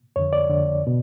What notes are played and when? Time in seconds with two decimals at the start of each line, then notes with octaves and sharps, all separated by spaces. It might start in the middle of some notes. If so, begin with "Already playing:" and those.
0.16 F2 D3 C#5
0.33 D5
0.49 F2 D3
0.87 B2